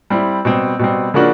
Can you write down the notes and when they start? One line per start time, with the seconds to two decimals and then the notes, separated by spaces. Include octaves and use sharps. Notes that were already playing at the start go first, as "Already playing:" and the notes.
0.10 G3 C4 E4
0.45 B2 G3 C4
0.79 B2 G3 C4
1.14 C#3 F3 A#3 D4 F#4